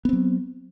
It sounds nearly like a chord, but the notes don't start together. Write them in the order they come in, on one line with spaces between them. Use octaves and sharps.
B3 C4 F#3